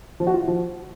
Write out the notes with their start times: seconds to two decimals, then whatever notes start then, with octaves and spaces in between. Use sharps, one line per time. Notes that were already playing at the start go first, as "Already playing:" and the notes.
0.20 F3
0.27 F#4
0.34 F4
0.41 E4
0.48 F3